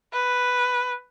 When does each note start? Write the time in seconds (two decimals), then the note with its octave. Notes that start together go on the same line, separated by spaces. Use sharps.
0.13 B4